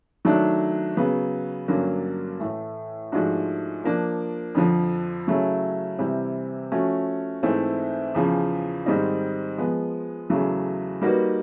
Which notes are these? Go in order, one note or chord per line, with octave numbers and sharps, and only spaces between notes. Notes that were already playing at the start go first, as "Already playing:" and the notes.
D#3 F#3 A3 D4
C#3 F#3 B3
G2 D3 F#3 A#3 C#4
A2 E3 A3
G#2 F3 A3 D4 F#4
F3 A#3 D4
F2 D3 F3
C#3 F#3 A3 C#4 E4
C3 E3 G3 C4
F3 A3 C#4 F#4
G#2 E3 A3 C4 E4
E2 C#3 F3
G#2 D#3 G3 C4 D#4
F3 G#3 B3
E2 C#3 F#3 A3
G3 A#3 D#4 F#4 B4